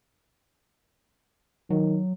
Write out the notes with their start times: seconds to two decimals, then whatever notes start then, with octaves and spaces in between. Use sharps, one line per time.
1.70 D#3 F#3